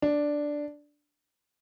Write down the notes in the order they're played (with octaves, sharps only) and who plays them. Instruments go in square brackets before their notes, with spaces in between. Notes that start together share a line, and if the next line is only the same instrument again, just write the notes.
[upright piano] D4